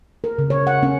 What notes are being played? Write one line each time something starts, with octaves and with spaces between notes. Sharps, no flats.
A#4
C#3
C#5
F#5
C#4